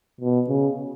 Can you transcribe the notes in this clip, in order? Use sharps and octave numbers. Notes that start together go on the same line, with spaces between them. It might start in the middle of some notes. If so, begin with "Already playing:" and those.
B2
C#3